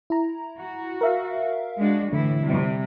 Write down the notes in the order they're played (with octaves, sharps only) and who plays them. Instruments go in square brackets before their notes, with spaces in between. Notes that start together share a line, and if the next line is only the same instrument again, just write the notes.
[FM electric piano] E4 A#5
[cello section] F#4
[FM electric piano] A#4 E5 F5
[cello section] G#3 D4 F#4
[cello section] A2 E3 E4 [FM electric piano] D3
[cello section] C3 G3